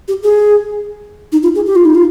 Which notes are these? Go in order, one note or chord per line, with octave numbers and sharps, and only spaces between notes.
G4
G#4
D#4
F4
G#4
G4
F4
D#4
F4